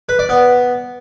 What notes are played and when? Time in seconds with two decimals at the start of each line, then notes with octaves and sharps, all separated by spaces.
0.09 B4
0.19 D5
0.29 B3